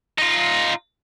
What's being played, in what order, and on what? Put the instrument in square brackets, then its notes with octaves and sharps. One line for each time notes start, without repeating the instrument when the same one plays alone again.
[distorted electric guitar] D#4 F4